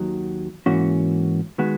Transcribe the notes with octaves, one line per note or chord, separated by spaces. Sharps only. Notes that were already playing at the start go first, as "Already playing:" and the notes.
Already playing: D#2 D#3 F#3
G#2 E3 A#3 C#4 F#4
D#3 G#3 B3 F#4